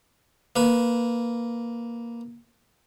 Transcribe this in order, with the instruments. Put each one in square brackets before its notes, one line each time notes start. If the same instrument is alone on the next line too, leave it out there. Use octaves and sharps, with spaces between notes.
[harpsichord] A#3 B4